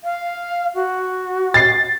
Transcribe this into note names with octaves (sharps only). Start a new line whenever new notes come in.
F5
F#4
A6 C7